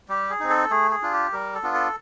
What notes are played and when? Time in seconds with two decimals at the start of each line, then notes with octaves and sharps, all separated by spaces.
0.09 G3 G4
0.30 G#4
0.40 C4 D#4
0.50 A4
0.71 A3 G#4
0.91 G#4
1.02 D4 F4
1.13 G4
1.32 G3 A#4
1.54 A4
1.63 B3 D4 F4
1.74 A4